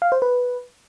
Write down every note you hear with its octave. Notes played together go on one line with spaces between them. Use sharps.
F5
C5
B4